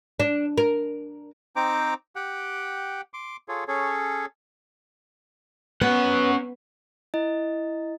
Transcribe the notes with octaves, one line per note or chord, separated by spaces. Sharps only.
D4
A#4
C4 D#4 C5 G5 A#5 D6
G4 F#5 G5
C6 D6
F4 G#4 A4 C#5
C#4 G#4 A4 C#5
B3 C#4 F#5
E4 D#5